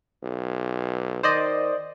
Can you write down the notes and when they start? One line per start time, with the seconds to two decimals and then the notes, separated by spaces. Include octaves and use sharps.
0.23 B1
1.23 D#3 C5 D5 D#5